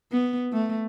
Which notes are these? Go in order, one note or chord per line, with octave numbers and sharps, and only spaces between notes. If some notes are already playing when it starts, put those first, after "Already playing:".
B3
A3